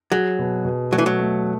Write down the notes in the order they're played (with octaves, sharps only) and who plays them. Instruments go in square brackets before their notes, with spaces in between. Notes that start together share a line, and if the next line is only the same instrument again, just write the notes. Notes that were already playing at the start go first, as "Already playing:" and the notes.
[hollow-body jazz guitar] F#3 [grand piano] G#4
[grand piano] B2
B2
[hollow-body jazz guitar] F#3 [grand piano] A3
[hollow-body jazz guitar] E3
F#3
[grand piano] A3